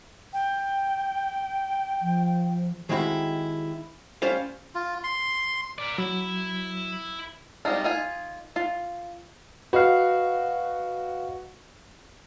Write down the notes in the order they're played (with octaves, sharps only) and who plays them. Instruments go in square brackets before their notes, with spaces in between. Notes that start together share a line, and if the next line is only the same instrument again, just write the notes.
[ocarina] G5
[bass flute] F3
[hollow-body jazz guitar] D#3 G#3 C4 E4 F#4 G4
G3 C#4 F4 C5 D5 F5
[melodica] F4
C6
[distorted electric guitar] A#4 D5
[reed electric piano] F#3 [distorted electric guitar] E4
[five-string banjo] G3 G#3 C4 D#4 F4
D#4 F4 G#5
F4
[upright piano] F#4 [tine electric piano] B4 D#5 F5